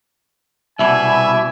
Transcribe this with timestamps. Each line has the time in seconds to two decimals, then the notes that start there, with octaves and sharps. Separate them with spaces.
0.79 C2 B2 D5 E5 G#5